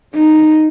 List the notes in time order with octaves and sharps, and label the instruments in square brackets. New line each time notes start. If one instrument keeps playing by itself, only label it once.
[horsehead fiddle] D#4